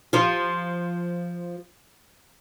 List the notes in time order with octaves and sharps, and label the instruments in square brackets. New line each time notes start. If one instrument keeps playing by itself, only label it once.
[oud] F3 F4